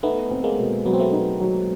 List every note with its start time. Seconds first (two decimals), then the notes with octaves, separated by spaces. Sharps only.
0.03 A3 B3 D#4
0.31 C4
0.44 G#3 A#3
0.58 B2
0.85 F#3 B3
0.93 C4
1.00 A3 B3
1.12 D#4
1.40 F#3